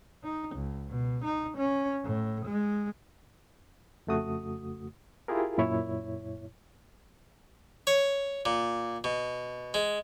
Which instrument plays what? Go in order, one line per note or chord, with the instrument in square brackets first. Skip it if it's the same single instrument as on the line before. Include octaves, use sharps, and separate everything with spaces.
[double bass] D#4
C#2
B2
D#4
C#4
A2
G#3
[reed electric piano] F2 C#3 A3 F#4 D#6
E4 F4 G4 G#4 A#4
F#2 A#2 E4 C#5
[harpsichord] C#5
A#2
B2
G#3